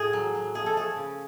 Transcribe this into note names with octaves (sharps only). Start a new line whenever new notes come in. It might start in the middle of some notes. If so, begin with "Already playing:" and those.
Already playing: A2 G#4
F#3
F#3
F3 G#4
A4
A3 G#4
C#3